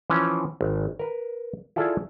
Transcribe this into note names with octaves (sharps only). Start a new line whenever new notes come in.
E3 F3 C#4
G#1
A#4 B4
E4 F4 G#4 A4 D5